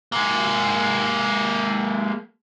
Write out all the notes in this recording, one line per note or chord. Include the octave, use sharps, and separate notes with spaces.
G#3 A#3